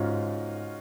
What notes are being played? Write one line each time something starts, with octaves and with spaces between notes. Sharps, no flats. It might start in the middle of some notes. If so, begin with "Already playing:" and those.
Already playing: G#2 C#4 D#4 F4 F#4